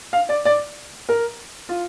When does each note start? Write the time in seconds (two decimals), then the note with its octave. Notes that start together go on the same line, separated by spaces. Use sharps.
0.13 F5
0.29 D5
0.45 D5
1.09 A#4
1.69 F4